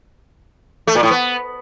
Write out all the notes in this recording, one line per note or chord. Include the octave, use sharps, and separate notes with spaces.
A3
A#2
A2
B3